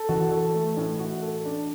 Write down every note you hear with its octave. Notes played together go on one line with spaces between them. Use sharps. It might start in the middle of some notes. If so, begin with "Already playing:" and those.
Already playing: A4
E3 F#4
A4
A3
A2
F#4
A4
D4